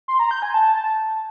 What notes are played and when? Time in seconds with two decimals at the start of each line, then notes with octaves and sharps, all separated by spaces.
0.08 C6
0.19 A#5
0.31 G6
0.42 G#5
0.54 A5